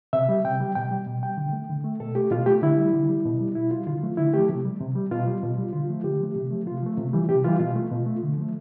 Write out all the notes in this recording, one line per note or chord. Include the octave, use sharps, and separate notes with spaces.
C3 E5
G3
C3 G5
G3
B2 G5
G3
B2
G3 G5
D3
A3
D3
A3
B2 A4
A3 G4
B2 F4
A3 G4
D3 E4
G3
D3
G3
B2
G3
B2 E4
G3 F4
D3 F4
F3 A3
D3 E4
F3 A3 G4
C3
G3
C3
G3
B2 F4
G3
B2
G3
D3 F4
F3 A3
D3 G4
F3 A3
C3
F3 A3
C3 F4
F3 A3
C3
E3 G3
C3 G4
E3 G3 F4
B2 F4
A3
B2
A3
D3
F3 A3